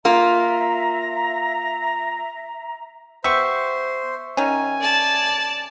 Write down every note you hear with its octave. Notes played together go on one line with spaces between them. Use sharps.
A#3 F4 E5 A#5
B3 G4 C5 E5 C#6
D#3 C#4 G#5
D5 A5